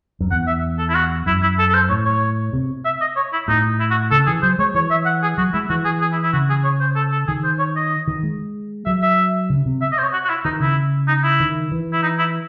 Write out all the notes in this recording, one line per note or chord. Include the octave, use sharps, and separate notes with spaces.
F#2
E2 F#5
E5
A4
E4
F#4
F#2 E4
E4
A4
A4
C5
A2 C#5
C#5
C3
E5
D#5
C#5
E4
A2 D#4
E4
F#4
C#3 A4
E3 G#4
F#3 C5
G#3 C#5
E3 C#5
E5
F#5
G#4
F#3 F#4
G#3 E4
E3 F#4
G#4
G#4
E4
E4
C#3 F#4
G#4
C#5
C5
A4
A4
D#3 G#4
C5
C#5
D#5
D#3
G#3
F#3 E5
E5
C#3
C3
E5
D#5
C5
C#5
F#4
F#4
E4
D#3 D#4
C#3 E4
D#4
E4
D#3
E3
E4
D#4
E4